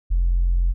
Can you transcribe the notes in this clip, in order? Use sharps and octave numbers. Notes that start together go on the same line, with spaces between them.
F1